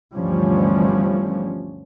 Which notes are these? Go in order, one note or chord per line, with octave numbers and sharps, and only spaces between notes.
G1 D2 E3 F3 G3 C#4